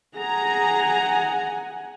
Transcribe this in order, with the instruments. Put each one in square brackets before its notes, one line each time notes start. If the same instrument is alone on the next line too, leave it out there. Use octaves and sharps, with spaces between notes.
[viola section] G#4 A#5 [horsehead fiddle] F#5 G#5